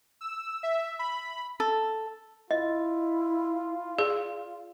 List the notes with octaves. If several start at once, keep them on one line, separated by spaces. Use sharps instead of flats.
E6
E5
B5
A4
E4 F4 D#5
G#4 D5